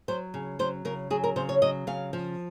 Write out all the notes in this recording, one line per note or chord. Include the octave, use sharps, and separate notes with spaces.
F#3 C5
C#3
F#3 C5
C#3 A#4
F#3 G#4
A#4
C#3 C5
C#5
F#3 D#5
C#3 F5
F3